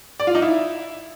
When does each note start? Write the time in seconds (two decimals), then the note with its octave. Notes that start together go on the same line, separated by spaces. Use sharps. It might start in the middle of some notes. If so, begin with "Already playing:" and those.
0.20 D5
0.27 F4
0.35 D#4
0.42 E4